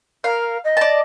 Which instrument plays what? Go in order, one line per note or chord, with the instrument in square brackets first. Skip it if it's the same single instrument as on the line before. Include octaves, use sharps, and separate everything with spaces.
[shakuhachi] A#4 [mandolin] F5
[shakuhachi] D#5
[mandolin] D5 A5